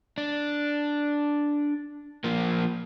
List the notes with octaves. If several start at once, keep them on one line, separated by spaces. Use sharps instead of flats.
D4
F3 A#3